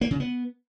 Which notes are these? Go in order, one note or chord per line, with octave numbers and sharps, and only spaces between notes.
A#3
C#3
B3